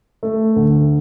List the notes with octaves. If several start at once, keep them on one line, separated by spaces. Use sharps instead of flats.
A3
D2